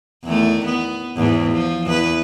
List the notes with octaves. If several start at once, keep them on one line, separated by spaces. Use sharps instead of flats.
E2 D#3 A3
B3
E2 G#2
F3
E2 B4